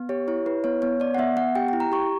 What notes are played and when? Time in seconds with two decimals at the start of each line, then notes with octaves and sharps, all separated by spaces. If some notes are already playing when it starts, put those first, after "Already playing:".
Already playing: B3
0.09 G4 C#5
0.28 E4 C#5
0.46 E4 B4
0.64 B3 C#5
0.82 B3 C#5
1.00 B3 D5
1.15 F#5
1.18 B3 E5
1.37 B3 F#5
1.55 G4 G5
1.68 E4 G5
1.80 A#5
1.92 G4 C#6